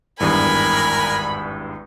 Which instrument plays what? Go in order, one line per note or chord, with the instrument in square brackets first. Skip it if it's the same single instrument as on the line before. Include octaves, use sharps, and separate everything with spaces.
[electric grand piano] G#1 E2 G2 [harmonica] A#4 G#5 [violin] B5